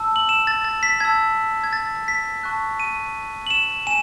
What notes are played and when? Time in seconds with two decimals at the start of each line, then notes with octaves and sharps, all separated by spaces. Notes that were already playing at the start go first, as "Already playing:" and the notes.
Already playing: A5 E6
0.16 F#7
0.29 E7
0.47 A6
0.64 A6
0.83 B6
1.00 A5 E6 G#6
1.64 G#6
1.73 A6
2.08 B6
2.43 A5 C#6 F#6
2.80 D#7
3.47 F#7
3.51 E7
3.87 G#5 E7